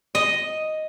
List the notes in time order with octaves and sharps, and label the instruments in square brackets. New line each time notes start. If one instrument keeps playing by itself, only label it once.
[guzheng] D#5